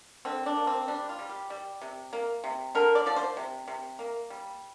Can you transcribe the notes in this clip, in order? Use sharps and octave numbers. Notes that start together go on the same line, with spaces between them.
D3 C4
D4
A#3
C4
G3 D4
F4
G3
G4
G3
C3
A#3
C3
D3 A#4
D5
F3 D5
C5
C3
C3
A#3
G3